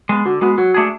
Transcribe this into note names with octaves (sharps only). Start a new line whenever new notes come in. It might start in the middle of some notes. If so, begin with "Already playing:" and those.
G#3 B3
D3 F#4
G#3 B3 F#4
F#3 F#4
A3 D4 G#4